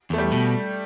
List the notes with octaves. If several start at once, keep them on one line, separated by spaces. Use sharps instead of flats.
E2 A3
G3
B2